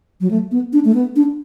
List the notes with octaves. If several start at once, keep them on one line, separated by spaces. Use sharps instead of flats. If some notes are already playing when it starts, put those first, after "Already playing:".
F#3
A3
B3
D4
A3
B3
D4